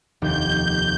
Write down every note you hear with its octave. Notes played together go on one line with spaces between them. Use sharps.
F1 D#2 G6